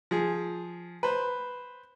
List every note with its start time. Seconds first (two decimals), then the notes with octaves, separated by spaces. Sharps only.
0.11 F3 G#4
1.03 B4 C5